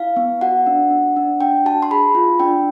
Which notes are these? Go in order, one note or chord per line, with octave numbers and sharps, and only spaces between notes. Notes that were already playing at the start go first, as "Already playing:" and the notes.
Already playing: E4 F5
B3
F#4 F#5
D4
D4
D4
D4 G5
F#4 A5
C6
G#4 B5
F4
D4 G5